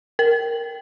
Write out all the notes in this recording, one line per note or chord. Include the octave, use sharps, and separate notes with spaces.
A#4